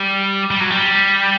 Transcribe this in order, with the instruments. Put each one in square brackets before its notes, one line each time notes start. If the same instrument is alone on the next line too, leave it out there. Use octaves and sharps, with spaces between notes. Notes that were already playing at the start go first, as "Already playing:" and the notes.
Already playing: [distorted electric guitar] G3
G3
F#3
G3